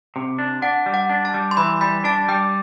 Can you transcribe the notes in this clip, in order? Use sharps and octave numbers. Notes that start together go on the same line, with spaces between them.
C3
D4
D4 F#5
G3
F#5
D4
A5
G3
C6
E3 B5
G3 B5
D4 A5
G3 G5